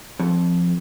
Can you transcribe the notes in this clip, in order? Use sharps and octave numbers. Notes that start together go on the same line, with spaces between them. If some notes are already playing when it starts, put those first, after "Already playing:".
F2